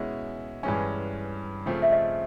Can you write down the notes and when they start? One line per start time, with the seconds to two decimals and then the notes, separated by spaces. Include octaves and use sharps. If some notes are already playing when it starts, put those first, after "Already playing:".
Already playing: B2 G#3 C#4 E4
0.63 G2 E3 G#3 C#4 G#5
1.66 C#3 F3 A3 C4 G5
1.82 E5
1.92 D#5